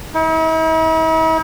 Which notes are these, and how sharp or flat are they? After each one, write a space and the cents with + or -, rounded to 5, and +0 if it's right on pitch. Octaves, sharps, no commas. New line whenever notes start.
E4 -45